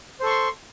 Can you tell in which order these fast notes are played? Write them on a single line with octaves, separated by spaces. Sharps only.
C5 A4 C#6 C6